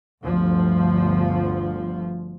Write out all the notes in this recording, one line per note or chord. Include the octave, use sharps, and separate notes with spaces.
G1 D2 F3